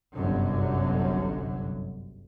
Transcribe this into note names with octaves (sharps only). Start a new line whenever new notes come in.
G1 C2 F#2 D3 F#3